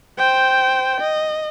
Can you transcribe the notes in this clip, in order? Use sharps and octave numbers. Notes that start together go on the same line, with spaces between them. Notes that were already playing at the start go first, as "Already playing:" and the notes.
C5 G5
D#5